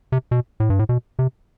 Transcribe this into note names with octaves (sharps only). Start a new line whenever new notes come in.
C3
B2
A2
G2
A2
B2
C3